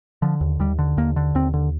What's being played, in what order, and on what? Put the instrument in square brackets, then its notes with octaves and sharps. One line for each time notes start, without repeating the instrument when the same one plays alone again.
[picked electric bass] D3 F3
D#2
D#2 G3
D3
D#2 A#3
D3
D#2 C4
D3